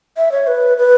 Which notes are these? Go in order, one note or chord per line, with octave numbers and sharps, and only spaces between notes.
E5
C#5
B4
B4